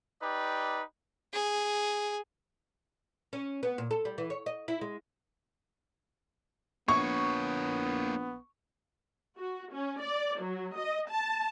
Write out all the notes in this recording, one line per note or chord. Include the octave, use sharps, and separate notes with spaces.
D#4 G4 B4 D5
G#4
C#4
B3
A#2
A4
G3
E3
C#5
D#5
E4
G#3
A#1 A#3 B3 C#5 C#6
F#4
C#4
D5
F#3
D#5
A5